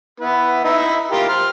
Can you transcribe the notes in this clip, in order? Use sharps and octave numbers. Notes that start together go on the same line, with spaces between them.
B3 E4 B4
D#4 E4 E5
F4 G4 A#4
C5 F6